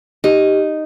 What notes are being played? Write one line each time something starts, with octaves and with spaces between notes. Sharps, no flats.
D#4 G4